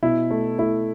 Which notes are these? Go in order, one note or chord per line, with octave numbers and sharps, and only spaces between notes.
B2 E4
A3
A3 E4